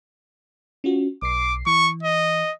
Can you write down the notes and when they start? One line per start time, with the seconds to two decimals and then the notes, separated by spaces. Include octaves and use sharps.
0.84 C#4 F4 F#4
1.22 B1 D6 C7
1.67 E3 C#6
2.03 D#5